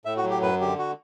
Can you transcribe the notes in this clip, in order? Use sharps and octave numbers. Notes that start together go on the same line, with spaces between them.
A2 E5
F#4
F#3
G4
F#2 B4
D3 G4
F#4